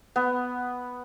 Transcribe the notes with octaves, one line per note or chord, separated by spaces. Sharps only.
B3